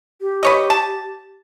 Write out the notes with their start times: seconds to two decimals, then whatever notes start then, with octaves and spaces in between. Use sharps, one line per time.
0.21 G4
0.43 B4 C#5 D#5
0.70 A5